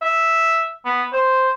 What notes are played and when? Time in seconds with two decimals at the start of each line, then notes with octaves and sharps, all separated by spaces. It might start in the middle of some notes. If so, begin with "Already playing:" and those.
0.02 E5
0.85 B3
1.12 C5